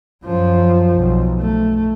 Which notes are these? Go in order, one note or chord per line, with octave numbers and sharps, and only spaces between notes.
F#2 F3
B1
A3